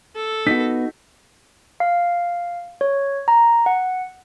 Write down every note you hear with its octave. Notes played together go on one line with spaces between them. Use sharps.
A4
B3 D#4 F#4 B6
F5
C#5
A#5
F#5